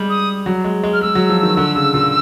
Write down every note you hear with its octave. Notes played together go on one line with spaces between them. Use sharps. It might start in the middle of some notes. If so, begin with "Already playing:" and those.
Already playing: G3 G#3
D#6
F#3
G#3
G#3
F6
G#3 E6
F#3
F3
D#3
D3
C#3
A#2